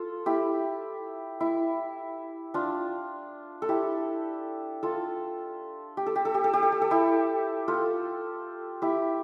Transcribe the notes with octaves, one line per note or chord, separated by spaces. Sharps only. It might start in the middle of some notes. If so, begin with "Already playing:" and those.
Already playing: F4 A4
E4 G4
E4
D4 F4
A4
E4 G4
F4 A4
G4
A4
G4
A4
G4
A4
G4
A4
G4
A4
E4 G4
F4 A4
E4 G4